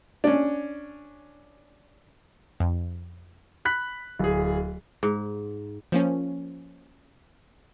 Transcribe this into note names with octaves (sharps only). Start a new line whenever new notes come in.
C#4 D4
F2
B5 F#6 B6
D1 G#4
G#2
F3 A#3 C#4